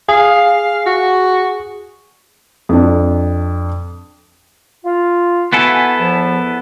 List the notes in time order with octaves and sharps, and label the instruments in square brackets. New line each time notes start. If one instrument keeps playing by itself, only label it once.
[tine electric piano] G#4 [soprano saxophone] F5
[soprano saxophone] F#4
[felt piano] F2 D4
[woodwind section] F4
[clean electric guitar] B3 E4 A4 [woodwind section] F#4 G#5
[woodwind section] E2 F3